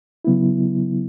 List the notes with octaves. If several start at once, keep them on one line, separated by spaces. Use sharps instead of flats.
C#3 F#3 B3 E4